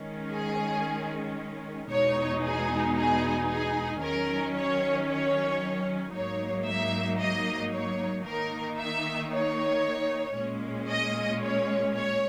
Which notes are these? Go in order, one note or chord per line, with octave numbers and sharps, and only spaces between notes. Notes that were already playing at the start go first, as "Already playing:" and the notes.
Already playing: D#3 G#3 C#4
G#4
E2 B2 G#3 D#4 C#5
G#4
G#4
G#4
D#3 F#3 C#4 A#4
C#5
C#5
G#2 F#3 A#3 D#4 C#5
E5
D#5
C#5
D#3 A#3 D#4 A#4
E5
C#5
A#2 G#3 C#4
D#5
C#5
C#5